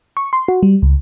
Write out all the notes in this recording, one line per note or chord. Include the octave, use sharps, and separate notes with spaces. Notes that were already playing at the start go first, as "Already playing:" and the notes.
C#6
C6
F#4
G3
C#2